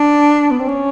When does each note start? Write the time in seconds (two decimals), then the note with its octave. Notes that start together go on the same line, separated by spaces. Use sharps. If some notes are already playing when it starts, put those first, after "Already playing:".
Already playing: D4
0.51 B3
0.59 C4
0.68 C#4